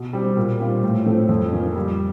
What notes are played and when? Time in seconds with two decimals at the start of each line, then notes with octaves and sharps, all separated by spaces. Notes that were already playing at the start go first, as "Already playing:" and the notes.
Already playing: B2
0.13 G3 C4
0.37 A#2
0.60 G3 C4 F4
0.83 A2
1.06 F3 A3 C4
1.29 F2
1.53 C#3 F3 A#3 C#4
1.76 G3